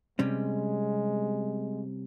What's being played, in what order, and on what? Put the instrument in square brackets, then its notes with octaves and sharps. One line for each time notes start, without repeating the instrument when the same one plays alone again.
[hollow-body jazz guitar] C3 G3 C#4 [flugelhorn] G#3